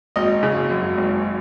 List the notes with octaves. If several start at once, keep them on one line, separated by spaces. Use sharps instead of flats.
G#1 D#5
C#3
F#2
G#1